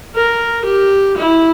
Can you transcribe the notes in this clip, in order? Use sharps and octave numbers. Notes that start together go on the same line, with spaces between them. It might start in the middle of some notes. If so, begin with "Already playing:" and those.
A#4
G4
E4